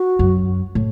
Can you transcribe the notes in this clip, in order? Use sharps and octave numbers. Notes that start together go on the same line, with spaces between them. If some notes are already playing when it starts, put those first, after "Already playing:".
Already playing: F#4
F#2
A2